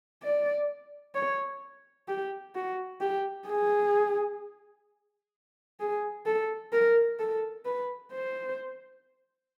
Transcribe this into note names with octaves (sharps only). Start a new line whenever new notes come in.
D5
C#5
G4
F#4
G4
G#4
G#4
A4
A#4
A4
B4
C5